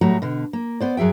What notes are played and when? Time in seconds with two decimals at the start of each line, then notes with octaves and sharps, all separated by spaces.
0.01 A2 F#3 G3 A3 F#4 A#5
0.22 B2 D3
0.53 A#3
0.80 B3 C5 D5
0.97 F#2 F#3 G#4 E5 G5